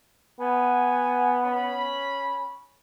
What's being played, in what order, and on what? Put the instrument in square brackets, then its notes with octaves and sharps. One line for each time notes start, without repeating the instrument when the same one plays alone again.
[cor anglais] B3 [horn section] F#5 G#5
[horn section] C#4 C#5 B5